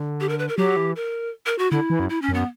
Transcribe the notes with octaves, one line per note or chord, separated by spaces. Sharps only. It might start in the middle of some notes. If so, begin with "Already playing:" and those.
Already playing: D3
G4
A#4
B4
A#4
F#3 G4
E3
A#4
A#4
F#4
D3 E4
E3
F#2
E4
C#4
F#2
B3